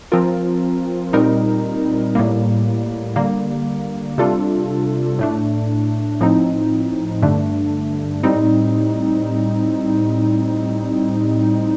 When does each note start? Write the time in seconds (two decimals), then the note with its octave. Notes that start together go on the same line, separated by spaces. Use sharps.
0.12 F3 C4 F4 A#4
1.13 A#2 G3 C4 D#4 A#4
2.15 A2 G3 A#3
3.16 D3 G3 A#3
4.18 C3 G3 D4 F4 A4
5.19 A2 A3 D4
6.21 A2 F3 C4 D#4
7.22 G2 D3 A3 D4
8.23 A2 G3 C4 D#4